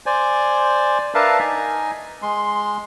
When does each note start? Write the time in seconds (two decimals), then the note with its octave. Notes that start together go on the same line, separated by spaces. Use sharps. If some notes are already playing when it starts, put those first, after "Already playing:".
0.06 C5 D5 G#5
1.15 D4 A#4 B4 E5 F5 A5
1.40 D#4 G#5
2.22 G#3 C6